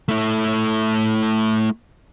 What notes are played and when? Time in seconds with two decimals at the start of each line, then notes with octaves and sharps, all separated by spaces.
0.08 A3 E4